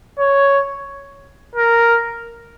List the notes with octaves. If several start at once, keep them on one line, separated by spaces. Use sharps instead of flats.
C#5
A#4